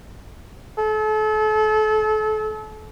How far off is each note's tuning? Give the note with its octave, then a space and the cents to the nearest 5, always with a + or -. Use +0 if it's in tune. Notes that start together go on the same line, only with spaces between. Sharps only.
A4 -35